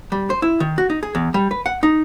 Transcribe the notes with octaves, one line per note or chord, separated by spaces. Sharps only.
G3
C5
E4
D#3
F#4
D#4
G#4
E2
G3
B4
F#5
D#4